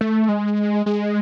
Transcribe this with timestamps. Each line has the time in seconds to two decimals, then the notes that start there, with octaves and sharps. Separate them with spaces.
0.01 A3
0.29 G#3
0.86 G#3